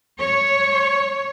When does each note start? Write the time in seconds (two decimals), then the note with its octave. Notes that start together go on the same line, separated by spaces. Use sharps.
0.18 C#5